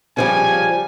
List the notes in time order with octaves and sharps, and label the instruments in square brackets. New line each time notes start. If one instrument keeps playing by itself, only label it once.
[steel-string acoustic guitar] C#3 F3 G3 [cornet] G#5